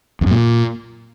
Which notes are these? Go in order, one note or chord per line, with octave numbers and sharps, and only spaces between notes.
E2
F#2
A#2